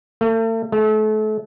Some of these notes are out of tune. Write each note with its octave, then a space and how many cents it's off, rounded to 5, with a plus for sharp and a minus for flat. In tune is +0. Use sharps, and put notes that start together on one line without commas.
A3 +40
A3 -35